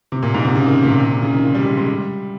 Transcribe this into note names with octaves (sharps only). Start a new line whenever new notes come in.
C3
A#2
G#2
C3
C#3
D#3
A#2
C3
A#2
C3
C#3
D#3
D#3
G3
G#3
G#3
G3